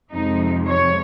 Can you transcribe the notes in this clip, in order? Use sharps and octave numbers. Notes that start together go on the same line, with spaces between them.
F2 C3 F3 G#3 D#4
C#5